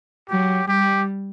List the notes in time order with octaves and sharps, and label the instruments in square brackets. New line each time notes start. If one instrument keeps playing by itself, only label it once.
[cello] F#3 [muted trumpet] G4
[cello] G3 [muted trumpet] G4